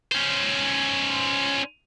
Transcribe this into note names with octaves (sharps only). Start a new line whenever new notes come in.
C#4 C5